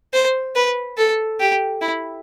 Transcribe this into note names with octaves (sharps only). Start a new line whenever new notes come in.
C5
B4
A4
G4
E4